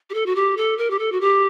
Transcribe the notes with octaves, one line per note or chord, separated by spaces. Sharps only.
G4
A4
F#4
G4
A4
A#4
G4
A4
F#4
G4